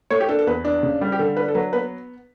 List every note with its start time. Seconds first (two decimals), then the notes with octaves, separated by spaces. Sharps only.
0.10 A3 C#5
0.20 G4
0.29 D4 A4
0.39 A4
0.47 E2 B4
0.65 D4
0.83 C#3
1.01 G3
1.12 G4
1.19 D3 A4
1.37 D4 B4
1.48 A4
1.54 F#3 B4
1.73 B3 B4